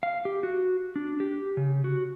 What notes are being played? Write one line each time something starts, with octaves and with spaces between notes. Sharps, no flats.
F5
G4
F#4
D4
G4
C#3
F#4